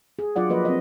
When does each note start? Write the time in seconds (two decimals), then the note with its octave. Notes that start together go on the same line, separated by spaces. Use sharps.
0.19 G#4
0.36 F#3 D4 F4 D5 F#5
0.50 F3 A#3 B4 D#5
0.65 C4 D#5